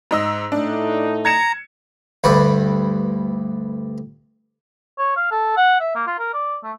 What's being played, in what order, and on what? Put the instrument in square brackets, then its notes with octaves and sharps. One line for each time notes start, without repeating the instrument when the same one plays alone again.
[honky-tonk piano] G#2 D#5 E6
[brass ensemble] A2 A3 D#4 [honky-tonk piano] D4
[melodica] A#5 [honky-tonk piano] G#6 C#7 E7
[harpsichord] D2 G2 B4
[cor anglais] C#5
F5
A4
F#5
E5
A#3
F4
A#4
D5
A3